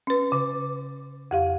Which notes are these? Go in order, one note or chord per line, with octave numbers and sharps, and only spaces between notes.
C#4 B4
C#3 D6
F2 G4 F5